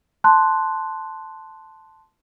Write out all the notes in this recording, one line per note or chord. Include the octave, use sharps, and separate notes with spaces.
A5 C6 F#6